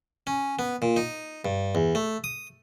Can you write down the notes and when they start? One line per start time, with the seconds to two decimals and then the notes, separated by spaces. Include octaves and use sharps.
0.27 C#4
0.59 B3
0.82 A#2
0.97 D#4
1.45 G2
1.75 E2
1.95 A3
2.24 D#6